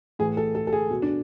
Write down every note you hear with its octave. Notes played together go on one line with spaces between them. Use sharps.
A2 E3 G#4
A4
A4
A4
G#4
B2
D4